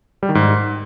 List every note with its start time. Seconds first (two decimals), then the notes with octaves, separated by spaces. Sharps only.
0.23 G3
0.29 D#3
0.35 G#2